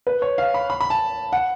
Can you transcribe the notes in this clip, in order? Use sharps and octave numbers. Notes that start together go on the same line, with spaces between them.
B4
C#5
F5
B5
B5
B5
A5
F#5